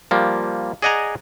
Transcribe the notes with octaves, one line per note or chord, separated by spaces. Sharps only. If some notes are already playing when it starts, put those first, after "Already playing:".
F3 G3 A#3
G#4 D5 D#5 F#5 G#5 A#5